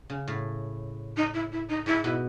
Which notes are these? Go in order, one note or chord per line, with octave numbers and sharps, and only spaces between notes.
C#3
A2
D#4
E4
E4
D#4
G#2 E4
B2 E4